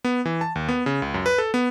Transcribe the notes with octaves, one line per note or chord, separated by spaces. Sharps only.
B3
E3
A5
D#2
B3
C#3
C#2
F#2
B4
A4
B3